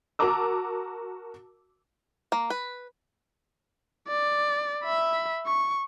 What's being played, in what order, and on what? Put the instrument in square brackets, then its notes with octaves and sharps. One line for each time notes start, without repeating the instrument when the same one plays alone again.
[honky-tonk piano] F#4 A#4 A5 A#5 D6 E6
[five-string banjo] A#3
B4
[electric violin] D5
E5 B5
C#6